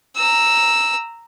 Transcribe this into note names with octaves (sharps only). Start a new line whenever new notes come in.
A#5 E6